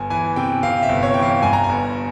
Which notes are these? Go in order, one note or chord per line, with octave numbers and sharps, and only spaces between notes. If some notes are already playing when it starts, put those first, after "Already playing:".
Already playing: G1 G#5
E3 G#5
C3 G5
C3 F5
E5
G1
C#5
E3 G5
F5
G2 G#5
A#5
G#5
G1